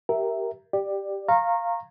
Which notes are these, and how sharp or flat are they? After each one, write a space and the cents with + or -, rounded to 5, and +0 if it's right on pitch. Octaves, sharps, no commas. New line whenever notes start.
G4 -15 A#4 +0 E5 +0
G4 +0 D5 +15
F5 -5 A#5 -10 C#6 -35